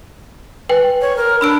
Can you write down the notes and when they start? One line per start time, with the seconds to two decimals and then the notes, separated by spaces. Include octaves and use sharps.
0.69 B4 G5 G#5
1.01 C#5
1.16 A#4
1.41 D4 B5 E6 D7